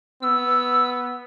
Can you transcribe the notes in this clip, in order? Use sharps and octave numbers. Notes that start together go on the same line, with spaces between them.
B3 E6